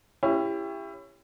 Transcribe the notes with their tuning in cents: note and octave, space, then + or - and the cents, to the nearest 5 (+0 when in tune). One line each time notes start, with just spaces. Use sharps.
C#4 +0 E4 +25 G4 +25